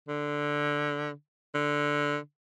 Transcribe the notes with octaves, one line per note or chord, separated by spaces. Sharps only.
D3
D3